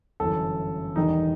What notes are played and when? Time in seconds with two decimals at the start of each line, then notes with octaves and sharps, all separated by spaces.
0.20 G1 F#2 E3 A4
0.95 E1 E2 D#3 G3 D#4